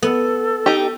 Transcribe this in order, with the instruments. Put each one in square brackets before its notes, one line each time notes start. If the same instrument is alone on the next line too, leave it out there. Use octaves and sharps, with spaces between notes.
[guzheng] B3 [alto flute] A4
[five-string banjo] D#4 G4